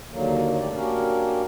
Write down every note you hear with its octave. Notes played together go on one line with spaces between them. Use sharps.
D#2 D3 D#3 F#3 A#3
G#2 A3 G4 D5
A#3 C#4 D4 F#4 G4 A#4